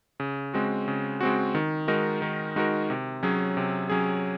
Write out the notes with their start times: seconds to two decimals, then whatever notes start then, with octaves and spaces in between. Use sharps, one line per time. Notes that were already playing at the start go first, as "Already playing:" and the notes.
0.20 C#3
0.54 G#3 C4 F#4
0.88 C#3
1.21 G#3 C4 F#4
1.55 D#3
1.88 G#3 D#4 F#4 A#4
2.22 D#3
2.56 G#3 D#4 F#4 A#4
2.90 C3
3.23 F#3 C#4 G#4
3.57 C3
3.89 F#3 C#4 G#4